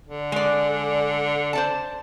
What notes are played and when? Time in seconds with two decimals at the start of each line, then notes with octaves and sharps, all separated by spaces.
0.08 D3
0.32 G#3 D5
1.53 C5 D5 A5